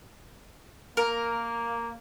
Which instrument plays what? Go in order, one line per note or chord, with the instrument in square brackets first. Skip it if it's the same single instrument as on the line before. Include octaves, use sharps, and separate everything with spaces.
[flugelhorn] A#3 [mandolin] A#4